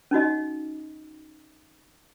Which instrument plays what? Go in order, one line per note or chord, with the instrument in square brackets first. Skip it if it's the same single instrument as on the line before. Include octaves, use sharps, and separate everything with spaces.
[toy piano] C#4 D#4 F#4 D#5